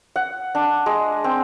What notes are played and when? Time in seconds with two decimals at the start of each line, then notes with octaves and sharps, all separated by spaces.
0.16 F#5
0.55 D4
0.86 G#3
1.24 C4